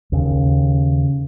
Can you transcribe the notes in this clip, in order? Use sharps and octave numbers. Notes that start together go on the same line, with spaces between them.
D#2 C#3